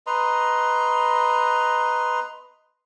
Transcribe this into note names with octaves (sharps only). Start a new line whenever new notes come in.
B4 D#5 A#5 C6